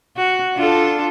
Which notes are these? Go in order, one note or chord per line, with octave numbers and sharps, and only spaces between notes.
F#4
D4 F4 A4